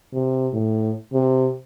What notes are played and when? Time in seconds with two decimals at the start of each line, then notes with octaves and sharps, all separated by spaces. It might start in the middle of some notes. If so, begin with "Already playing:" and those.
0.14 C3
0.53 A2
1.13 C3